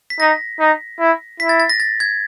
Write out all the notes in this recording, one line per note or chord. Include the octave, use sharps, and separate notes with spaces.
B6
D#4 A#6
D#4
E4
E4 B6
A6
A6
A#6
A6
G#6